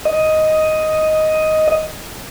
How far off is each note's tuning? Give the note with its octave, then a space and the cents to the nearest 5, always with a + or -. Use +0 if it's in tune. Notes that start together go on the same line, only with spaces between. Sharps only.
D#5 +5